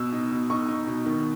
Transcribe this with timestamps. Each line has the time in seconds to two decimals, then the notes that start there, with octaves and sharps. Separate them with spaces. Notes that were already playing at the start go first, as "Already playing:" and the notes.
Already playing: B2 E6
0.12 D#4
0.32 B2
0.50 D#4 C#6
0.68 D#4
0.88 B2
1.06 D#3